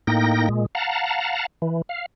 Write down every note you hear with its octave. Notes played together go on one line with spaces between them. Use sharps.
A2 A#3 D#4 G5 A#6
A#2 G#3
F5 F#5 A5 A#5
E3
F5